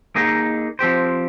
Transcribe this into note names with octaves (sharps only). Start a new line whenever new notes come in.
A#3 D#4 G#4 D#5
F3 C4 G4 C5